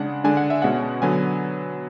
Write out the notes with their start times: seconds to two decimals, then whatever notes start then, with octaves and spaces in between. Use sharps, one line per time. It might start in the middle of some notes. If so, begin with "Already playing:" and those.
Already playing: C#3 G#3 D4 F#5
0.24 D3 G#3 D4 G#5
0.37 F#5
0.50 E5
0.62 B2 G#3 C#4 F#5
1.02 D3 F#3 B3 G#5